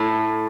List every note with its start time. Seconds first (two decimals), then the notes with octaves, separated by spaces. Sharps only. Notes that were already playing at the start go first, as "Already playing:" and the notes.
Already playing: A2